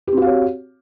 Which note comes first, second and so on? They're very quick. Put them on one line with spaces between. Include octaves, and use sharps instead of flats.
G4 C4 F#4 F5 C#5